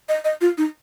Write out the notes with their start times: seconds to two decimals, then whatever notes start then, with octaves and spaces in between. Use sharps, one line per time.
0.09 D#5
0.24 D#5
0.41 F4
0.58 D#4